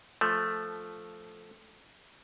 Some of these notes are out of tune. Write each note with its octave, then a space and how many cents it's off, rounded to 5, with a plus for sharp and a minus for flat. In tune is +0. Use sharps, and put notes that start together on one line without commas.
F3 +0 A3 +0